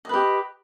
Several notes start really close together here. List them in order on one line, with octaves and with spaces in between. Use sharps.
D#5 B4 G4